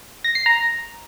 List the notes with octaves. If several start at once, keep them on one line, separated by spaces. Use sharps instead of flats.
A#6
C7
A#5